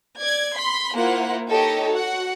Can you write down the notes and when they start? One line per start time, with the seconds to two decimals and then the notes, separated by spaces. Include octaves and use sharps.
0.21 D5 G#6
0.56 B5 C6
0.94 A#3 E4 F4 C5 F#5
1.48 D#4 G4 A4 C#5 D#5
1.90 F#4 F#5